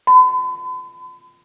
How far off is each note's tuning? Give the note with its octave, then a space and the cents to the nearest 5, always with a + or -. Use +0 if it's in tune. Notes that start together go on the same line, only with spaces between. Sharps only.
B5 +45